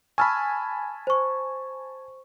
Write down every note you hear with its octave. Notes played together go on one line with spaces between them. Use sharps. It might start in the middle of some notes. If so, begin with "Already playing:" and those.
G#5 A5 B5 C#6 E6 F6
C5 C#6